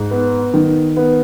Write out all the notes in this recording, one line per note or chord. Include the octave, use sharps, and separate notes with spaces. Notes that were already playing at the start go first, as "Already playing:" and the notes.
Already playing: G#2
B3
D#3
B3